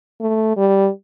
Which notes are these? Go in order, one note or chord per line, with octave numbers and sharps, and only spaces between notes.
A3
G3